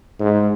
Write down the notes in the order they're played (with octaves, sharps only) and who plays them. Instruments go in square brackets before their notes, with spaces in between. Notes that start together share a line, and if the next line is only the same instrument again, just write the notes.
[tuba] G#2